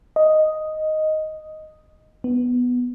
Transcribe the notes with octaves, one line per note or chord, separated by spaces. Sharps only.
D#5
B3